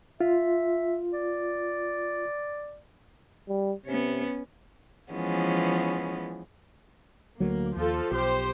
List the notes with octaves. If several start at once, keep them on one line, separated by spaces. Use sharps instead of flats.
F4 E5
D5
G3
C3 B3 C#4
E3 F3 G#3 B3 C#4
D2 F#3 A#3
D#2 F3 F4 A4
B1 G4 C5